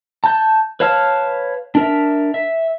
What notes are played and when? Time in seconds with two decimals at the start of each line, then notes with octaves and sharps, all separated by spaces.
0.24 A5 G6
0.80 B4 C#5 F5 A5 F6
1.75 D4 A#4 E5
2.34 E5